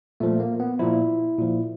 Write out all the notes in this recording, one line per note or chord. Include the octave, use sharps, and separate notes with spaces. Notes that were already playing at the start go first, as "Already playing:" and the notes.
A#2 F3 A3
A#3
B3
A#2 F3 E4
A#2 F3